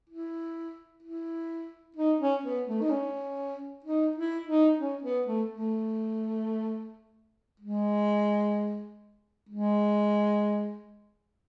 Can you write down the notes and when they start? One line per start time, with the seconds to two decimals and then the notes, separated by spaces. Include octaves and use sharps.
0.09 E4
1.02 E4
1.96 D#4
2.20 C#4
2.43 B3
2.68 A3
2.81 D#4
2.90 C#4
3.84 D#4
4.16 E4
4.47 D#4
4.79 C#4
5.03 B3
5.26 A3
5.49 A3
7.60 G#3
9.49 G#3